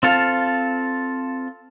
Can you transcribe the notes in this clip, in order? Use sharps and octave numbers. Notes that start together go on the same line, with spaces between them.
C4 F4 A4 F5